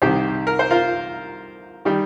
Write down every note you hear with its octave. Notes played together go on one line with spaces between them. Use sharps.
C2 C3 D#3 G4 C5
A#4
C5
F4 A#4
D#3 G3